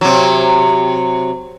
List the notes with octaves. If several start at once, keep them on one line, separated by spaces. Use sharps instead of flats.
C3 F#3